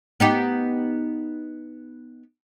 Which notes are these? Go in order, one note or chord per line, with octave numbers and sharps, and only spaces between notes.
B3 D#4 G4